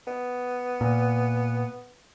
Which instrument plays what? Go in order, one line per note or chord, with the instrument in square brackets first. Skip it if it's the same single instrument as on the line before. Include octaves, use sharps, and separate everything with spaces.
[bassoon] B3
[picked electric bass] A#2